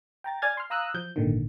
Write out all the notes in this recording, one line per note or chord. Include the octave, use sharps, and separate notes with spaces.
G5 A#5 A6
D5 G#5 F6 G#6 A6
C6 F6
F5 A#5 D#6 E6 F#6
F3 G6
G#1 A#2 D3 D#3